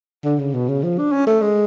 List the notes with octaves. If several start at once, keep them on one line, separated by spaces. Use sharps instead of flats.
D3
C#3
B2
C#3
F3
D4
C#4
A3
G#3